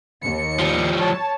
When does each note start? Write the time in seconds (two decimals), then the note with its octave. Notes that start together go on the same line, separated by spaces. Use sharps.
0.23 D#2 C#7
0.59 F3 G3
0.96 C#5 A5